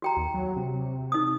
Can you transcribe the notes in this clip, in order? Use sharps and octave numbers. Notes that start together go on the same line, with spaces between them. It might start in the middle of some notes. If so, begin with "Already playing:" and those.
F#4 G5 A#5
D#2
F#3
C3
D#4 D#6